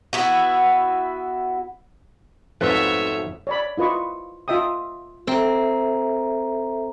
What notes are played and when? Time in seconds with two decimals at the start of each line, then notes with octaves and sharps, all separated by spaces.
0.13 B3 E4 F#4
2.61 F2 G#2 B2 F3 A3 B4 C#5 E5
3.47 C#5 D5 B5
3.78 E4 F4 B4 D#5 C#6
4.48 F4 D#5 E5 G5 D#6
5.27 C4 A4 E5 A#5